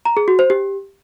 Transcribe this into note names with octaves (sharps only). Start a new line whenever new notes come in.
A#5
G#4
F#4
C5
G4